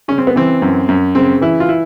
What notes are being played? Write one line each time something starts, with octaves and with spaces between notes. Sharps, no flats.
C#3 C#4
C4
B3
E3 C4
F#2
F#2
C#3 C4
E3 E4
F4
E4